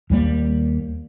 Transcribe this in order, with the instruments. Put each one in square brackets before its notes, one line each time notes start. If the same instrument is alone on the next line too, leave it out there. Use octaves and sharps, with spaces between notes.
[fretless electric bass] D#2 G3 A#3